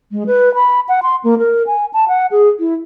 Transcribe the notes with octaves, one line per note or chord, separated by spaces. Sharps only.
G#3
B4
B5
F#5
C6
A#3
A#4
G#5
A5
F#5
G#4
E4